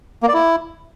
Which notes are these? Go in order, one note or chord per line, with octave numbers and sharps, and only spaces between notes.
A#3
D5
E4